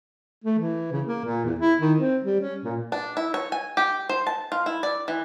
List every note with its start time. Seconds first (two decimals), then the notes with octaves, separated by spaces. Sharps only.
0.44 A3
0.59 E3
0.92 C#3
1.06 A#3
1.25 A#2
1.45 E2
1.59 E4
1.81 D#3
1.99 C4
2.24 G3
2.41 C#4
2.64 A#2
2.92 D4
3.17 E4
3.34 C#5
3.52 G#5
3.77 G4
4.09 C5
4.27 A5
4.52 F4
4.66 E4
4.83 D5
5.08 E3